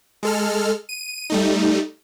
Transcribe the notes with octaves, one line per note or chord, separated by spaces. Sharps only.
G#3 A4 F6
D#7
G3 A3 D#4